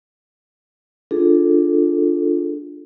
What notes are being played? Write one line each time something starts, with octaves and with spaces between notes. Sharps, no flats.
D4 F4 G#4 A4